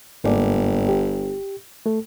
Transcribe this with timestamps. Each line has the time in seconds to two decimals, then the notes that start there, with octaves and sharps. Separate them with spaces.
0.24 G1 G#2 A#3 D5
0.89 G4
1.86 A3 A4